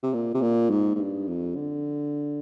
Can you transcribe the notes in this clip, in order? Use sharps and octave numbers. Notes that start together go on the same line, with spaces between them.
C3
A#2
C3
A#2
G#2
G#2
G2
F2
D3